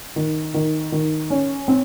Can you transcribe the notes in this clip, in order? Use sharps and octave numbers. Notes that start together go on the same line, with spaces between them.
D#3
D#3
D#3
C#4
C4